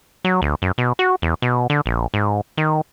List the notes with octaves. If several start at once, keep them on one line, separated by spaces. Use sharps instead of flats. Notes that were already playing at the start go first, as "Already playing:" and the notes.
F#3
D2
F#2
B2
F#4
E2
B2
D3
A#1
G#2
D#3